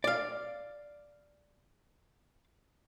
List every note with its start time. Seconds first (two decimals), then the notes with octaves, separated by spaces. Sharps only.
0.04 D5 F5